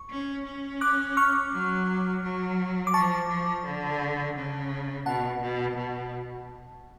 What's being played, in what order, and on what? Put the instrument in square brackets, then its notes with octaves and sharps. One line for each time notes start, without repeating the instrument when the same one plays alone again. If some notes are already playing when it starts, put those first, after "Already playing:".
Already playing: [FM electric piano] C#6
[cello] C#4
C#4
[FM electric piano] D6 F#6
C#6 F6
[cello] F#3
F#3
[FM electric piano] D6
[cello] F3 [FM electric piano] A5 C#6
[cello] F3
D3
C#3
[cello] B2 [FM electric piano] F#5 A5
[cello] B2
B2